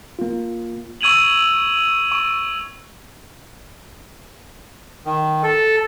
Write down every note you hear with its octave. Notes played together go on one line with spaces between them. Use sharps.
A#3 F4
C#6 E6 G#6 D#7 F7 F#7
C#6
D#3
A4